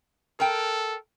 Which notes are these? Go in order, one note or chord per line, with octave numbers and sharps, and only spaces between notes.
A4 A#4 G5